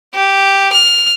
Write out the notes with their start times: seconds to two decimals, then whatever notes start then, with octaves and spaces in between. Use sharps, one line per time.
0.15 G4
0.73 F6